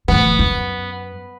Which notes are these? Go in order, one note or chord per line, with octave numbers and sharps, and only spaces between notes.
D1 E3 B3
F#2